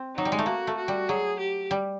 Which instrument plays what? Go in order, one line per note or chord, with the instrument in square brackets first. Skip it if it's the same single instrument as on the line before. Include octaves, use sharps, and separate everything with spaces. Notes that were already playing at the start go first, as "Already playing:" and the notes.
Already playing: [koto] C4
[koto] F#3 [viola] D#4
[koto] G3
G#3
A3
[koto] A#3 [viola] F#4
[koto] A3
[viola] F#4
[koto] G3
[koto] F#3 [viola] G#4
[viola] G4
[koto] G3